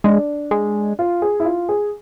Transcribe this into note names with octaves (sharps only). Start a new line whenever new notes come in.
G#3 D4
G#3
F4
G#4
E4
F4
G#4